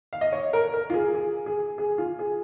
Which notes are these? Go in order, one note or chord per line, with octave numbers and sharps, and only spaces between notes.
F5
D#5
C#5
A#4
A#4
F4
G#4
G#4
G#4
G#4
F4
G#4